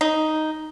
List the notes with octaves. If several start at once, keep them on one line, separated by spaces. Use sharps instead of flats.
D#4